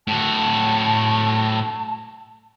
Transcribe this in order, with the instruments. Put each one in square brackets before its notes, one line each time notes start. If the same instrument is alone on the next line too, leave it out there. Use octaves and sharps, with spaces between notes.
[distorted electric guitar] A2 F#4 [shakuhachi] A5